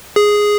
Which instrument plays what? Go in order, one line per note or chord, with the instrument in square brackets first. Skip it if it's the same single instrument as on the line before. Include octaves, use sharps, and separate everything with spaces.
[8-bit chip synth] G#4